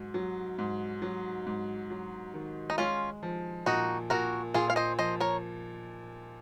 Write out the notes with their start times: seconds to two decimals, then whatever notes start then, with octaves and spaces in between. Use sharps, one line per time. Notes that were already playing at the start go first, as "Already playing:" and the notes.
Already playing: G#2 F#3
0.14 F#3
0.59 G#2
1.02 F#3
1.47 G#2
1.91 F#3
2.34 D#3
2.70 D#4
2.78 G#3 C#4 F4
3.23 F3
3.66 A#2 D#4 F#4
4.10 A#2 F#4 A#4
4.54 A#2 F4 G#4
4.70 F5
4.76 C5 D#5
4.99 F3 C5 D#5
5.20 A#4 C#5